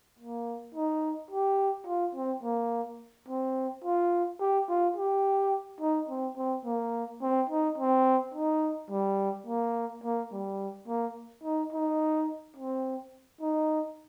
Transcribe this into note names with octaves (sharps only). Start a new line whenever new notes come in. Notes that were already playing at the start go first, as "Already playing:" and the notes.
A#3
D#4
G4
F4
C4
A#3
C4
F4
G4
F4
G4
D#4
C4
C4
A#3
C4
D#4
C4
D#4
G3
A#3
A#3
G3
A#3
D#4
D#4
C4
D#4